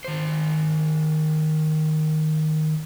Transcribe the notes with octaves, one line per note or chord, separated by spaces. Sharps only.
D#3 C5